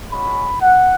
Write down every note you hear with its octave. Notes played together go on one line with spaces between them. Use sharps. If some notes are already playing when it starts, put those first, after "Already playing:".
G#3 C#4 F#4 B5
F#5